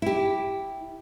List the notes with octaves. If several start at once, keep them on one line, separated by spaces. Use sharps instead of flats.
E4 G4